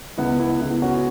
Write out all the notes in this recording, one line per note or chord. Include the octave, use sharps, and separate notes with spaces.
C#2 B3 E4
B3 E4
C#3 B3 E4
C#4 F#4